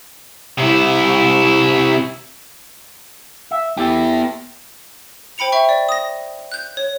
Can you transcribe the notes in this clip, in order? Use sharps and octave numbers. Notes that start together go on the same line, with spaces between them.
C3 E4
E5
B3 E4 G4 A4
C5 G5 B5 C#7 F7
E5 G5 C#6
D5
D#6 A#6
F#6 G6
C#5